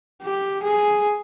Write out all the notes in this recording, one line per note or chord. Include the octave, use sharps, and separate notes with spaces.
G4
G#4